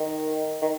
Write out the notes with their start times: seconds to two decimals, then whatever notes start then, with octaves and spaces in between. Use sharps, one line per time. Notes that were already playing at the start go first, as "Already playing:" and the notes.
Already playing: D#3
0.62 D#3